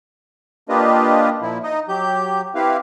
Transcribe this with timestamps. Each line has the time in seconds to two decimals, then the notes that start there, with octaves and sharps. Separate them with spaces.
0.69 A#3 D4 F4 G4 B4 D#5
1.42 A#2 F3 E4
1.64 D#4 D#5
1.89 F#3 G4 G6
2.55 C4 E4 G4 B4 F5